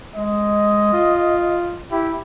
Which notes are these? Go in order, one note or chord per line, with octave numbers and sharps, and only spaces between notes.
G#3 D#5
F4
E4 G4